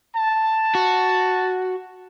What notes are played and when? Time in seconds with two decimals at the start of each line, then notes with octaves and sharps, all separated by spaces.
0.16 A5
0.75 F#4